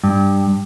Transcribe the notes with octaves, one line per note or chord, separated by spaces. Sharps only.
G2